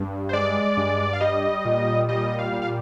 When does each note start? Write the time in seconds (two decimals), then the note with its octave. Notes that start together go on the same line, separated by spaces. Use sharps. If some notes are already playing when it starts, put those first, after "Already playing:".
Already playing: G2
0.29 C5
0.33 G#3 D5
0.77 G2
1.13 F5
1.21 G3 D#5
1.65 A#2
2.09 G3 D#5
2.39 F5
2.53 A#2
2.62 F5